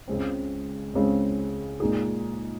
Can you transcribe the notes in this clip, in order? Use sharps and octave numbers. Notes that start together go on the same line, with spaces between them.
C#2 C#3 G#3 C4
C#2 C#3 G#3 C4
A#2 G#3 D#4 G#4